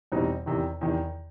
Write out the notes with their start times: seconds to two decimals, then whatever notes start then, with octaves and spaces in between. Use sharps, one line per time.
0.12 E2 B2 G3 C4 D#4
0.46 E2 C3 D#3
0.81 E2 C3 D#3